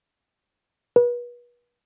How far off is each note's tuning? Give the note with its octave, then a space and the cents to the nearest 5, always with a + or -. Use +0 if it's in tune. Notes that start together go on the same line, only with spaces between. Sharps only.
B4 -35